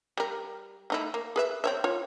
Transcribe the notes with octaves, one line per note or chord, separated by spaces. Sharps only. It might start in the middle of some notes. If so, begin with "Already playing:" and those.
G3 A#4
A3 D#4 E4
A#3
G#4 B4 E5
C4 C#5 E5
F4 C#5